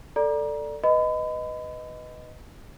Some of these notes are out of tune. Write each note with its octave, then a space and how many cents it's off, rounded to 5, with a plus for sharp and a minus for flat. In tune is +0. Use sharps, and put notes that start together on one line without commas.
A4 +10 D5 +0 A#5 +25
B4 +0 D#5 +0 B5 +35